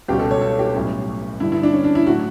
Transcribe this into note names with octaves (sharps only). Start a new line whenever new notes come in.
C#2 B2 G3 C#4 F#4 G4
A4
C#5
A4
G4
B1 A2 G3 C#4
G2 D3 G3 E4
E4
D4
C#4
D4
E4
A2 F#3 A3 F#4